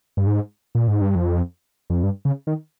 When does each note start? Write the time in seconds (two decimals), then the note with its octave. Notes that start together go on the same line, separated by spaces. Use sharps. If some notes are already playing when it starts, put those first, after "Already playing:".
0.17 G2
0.27 G#2
0.75 A#2
0.88 G#2
1.01 G2
1.15 F2
1.90 F2
2.03 G2
2.25 C#3
2.47 D#3